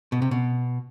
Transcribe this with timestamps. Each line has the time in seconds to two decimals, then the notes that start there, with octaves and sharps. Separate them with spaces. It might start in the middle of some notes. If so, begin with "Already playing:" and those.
0.12 B2
0.22 C3
0.31 B2